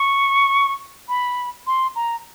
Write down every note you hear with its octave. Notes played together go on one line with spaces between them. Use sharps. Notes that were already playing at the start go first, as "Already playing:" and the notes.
Already playing: C#6
B5
C6
A#5